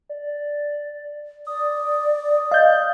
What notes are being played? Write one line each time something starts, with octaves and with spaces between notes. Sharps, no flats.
D5
D5 D#6
D#5 F5 G6